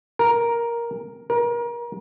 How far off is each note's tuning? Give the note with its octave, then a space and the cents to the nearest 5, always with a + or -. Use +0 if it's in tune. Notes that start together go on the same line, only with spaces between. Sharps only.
A#4 +5
A#4 +30